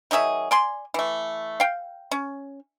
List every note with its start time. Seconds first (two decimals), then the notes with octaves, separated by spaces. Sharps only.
0.11 D#3 F#3 G#4 E5
0.51 D5 G#5 C6
0.94 E3 A3
1.60 F5 G5
2.11 C#4